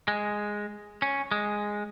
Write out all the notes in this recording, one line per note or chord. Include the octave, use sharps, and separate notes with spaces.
G#3
C#4
G#3